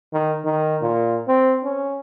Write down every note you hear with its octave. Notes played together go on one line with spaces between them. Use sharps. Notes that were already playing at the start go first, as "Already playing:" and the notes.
D#3
D#3
A#2
C4
C#4